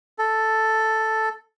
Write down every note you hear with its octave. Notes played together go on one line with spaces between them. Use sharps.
A4